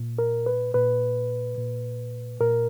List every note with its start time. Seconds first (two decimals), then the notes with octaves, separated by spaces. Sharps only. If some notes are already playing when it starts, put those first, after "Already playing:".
Already playing: A#2
0.18 A#4
0.46 B4
0.74 A#2 B4
1.57 A#2
2.40 A#2 A#4